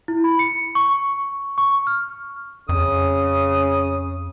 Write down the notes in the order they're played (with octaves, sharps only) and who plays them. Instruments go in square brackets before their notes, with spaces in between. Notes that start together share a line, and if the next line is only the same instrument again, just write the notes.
[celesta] E4
B5
C#7
C#6
C#6
F6
[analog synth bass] F2 [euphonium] C#3 [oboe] D#6